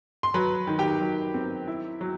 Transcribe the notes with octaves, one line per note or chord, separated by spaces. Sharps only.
C6
F#3 B4 B5
D#3
G4 G5
F#3
C4
E4
F#3